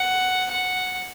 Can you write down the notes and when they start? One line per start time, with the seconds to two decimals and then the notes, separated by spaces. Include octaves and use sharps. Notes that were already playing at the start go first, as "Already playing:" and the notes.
Already playing: F#5
0.52 F#5